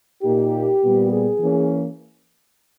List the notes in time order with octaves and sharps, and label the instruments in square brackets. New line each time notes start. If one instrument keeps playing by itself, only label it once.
[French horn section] A#2 A#3 D#4 G4
A#2 G3 B3
G#4
E3 A#3 C#4